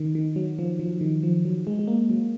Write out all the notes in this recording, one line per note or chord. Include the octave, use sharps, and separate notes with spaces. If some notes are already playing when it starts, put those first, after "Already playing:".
Already playing: D#3
D#3
F#3
F3
F3
D#3
F3
F#3
G#3
G#3
A#3
F#3